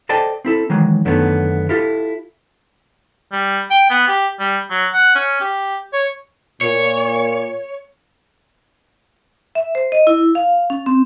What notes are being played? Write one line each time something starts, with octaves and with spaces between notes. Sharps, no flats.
A4 C5 D5 D#5 G5 A5
C4 E4 A4
D#3 E3 F#3 G#3
F#2 D3 D#3 A3 B3
E4 F4 G4 A4
G3
G5
B3
G4
G3
F#3
F#5
C#4
G4
C#5
A#2 C#5
E5
C5
D#5
E4
F5
C#4
C4